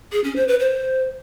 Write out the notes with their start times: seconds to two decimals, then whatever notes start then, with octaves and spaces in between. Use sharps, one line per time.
0.12 G#4
0.24 C#4
0.36 C5
0.48 B4
0.60 C5